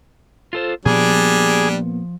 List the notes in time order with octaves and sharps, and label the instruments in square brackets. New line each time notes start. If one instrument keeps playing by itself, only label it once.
[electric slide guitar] F4 A4 C5
[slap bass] A#2 B3 [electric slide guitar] F3 [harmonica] G3 D4 [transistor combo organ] G#4